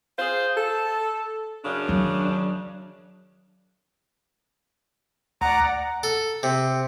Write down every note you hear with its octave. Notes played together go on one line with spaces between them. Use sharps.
F4 G#4 C5
A4
F#2 C#3 D4
D#3 F#3
D2 D5 F#5 A#5
A4
C3